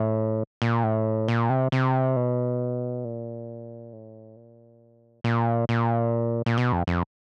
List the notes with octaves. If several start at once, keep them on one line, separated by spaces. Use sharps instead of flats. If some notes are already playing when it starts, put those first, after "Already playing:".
Already playing: A2
A#2
A2
A#2
C3
C3
B2
A#2
A2
A#2
A#2
A#2
A#2
B2
F2
F2